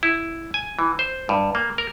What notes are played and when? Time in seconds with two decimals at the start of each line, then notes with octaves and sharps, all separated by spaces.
0.03 E4
0.54 G#5
0.79 E3
0.99 C5
1.29 G2
1.55 A#3
1.78 A#4